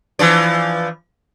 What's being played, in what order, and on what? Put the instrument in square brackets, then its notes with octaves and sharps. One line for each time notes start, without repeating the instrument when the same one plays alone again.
[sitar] E3 F3 D5